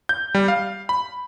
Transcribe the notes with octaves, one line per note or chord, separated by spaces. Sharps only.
G6
G3
F5
B5